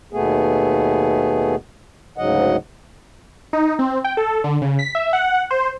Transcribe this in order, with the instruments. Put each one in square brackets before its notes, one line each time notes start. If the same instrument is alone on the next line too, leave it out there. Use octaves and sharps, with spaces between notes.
[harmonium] D#2 B2 A3 B3 G#4
D2 G#2 C#3 F#3 D#5 F#5
[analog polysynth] D#4
C4
G5
A4
D3
C#3
B6
E5
F#5
C5